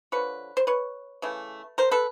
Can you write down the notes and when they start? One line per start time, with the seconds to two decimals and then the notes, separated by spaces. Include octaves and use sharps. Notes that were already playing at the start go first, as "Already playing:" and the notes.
0.12 D3 F3 B4 C#5
0.57 C5
0.67 B4 C#5
1.22 C#3 E3 A3
1.78 A#4 C5
1.91 A4 B4